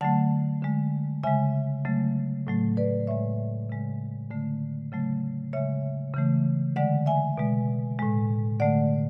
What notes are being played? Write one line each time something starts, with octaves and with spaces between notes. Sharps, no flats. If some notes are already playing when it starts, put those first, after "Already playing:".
D3 F#3 A3 F#5 A5
D3 G#3
C#3 G#3 E5 G#5
C#3 F#3 A3
A2 F#3 A3
B4 D5
A2 G#3 C#5 E5
C#3 G#3
D3 A3
C#3 F#3 A3
C#3 G#3 C#5 E5
C#3 E3 A3
D3 G#3 D5 F#5
E5 G#5
B2 G#3
A2 G#3
D3 A3 D5 F#5